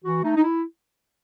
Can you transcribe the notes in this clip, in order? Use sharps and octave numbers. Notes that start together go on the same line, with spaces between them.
E3 F#4
A3 D#4
D#4
E4